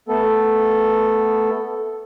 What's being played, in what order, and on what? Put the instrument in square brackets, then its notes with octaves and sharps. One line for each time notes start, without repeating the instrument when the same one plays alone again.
[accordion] A3 B3 A4